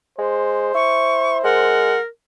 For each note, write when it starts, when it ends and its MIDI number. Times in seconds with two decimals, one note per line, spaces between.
0.19 0.74 56
0.19 1.91 72
0.74 1.43 64
0.74 1.38 85
1.44 1.96 56
1.44 2.07 70
1.44 2.00 78